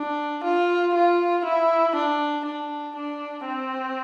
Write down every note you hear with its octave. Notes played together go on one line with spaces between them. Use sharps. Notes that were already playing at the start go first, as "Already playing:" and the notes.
Already playing: D4
F4
F4
E4
D4
D4
D4
C4